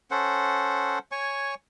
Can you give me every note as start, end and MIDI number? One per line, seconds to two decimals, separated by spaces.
0.11 0.99 61
0.11 0.99 69
0.11 0.99 72
0.11 0.99 78
1.12 1.55 73
1.12 1.55 80
1.12 1.55 85